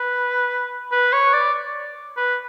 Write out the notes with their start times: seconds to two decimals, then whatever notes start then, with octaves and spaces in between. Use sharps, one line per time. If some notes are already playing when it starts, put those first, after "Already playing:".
Already playing: B4
0.91 B4
1.13 C#5
1.33 D5
2.17 B4